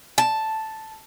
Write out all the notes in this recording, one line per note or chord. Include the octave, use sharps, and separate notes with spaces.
A5